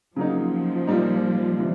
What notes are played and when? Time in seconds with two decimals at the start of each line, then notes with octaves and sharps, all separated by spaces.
0.16 C#3 F3 F#3 A#3 D#4
0.87 A#2 G3 A#3 D#4
1.59 C3 E3 G3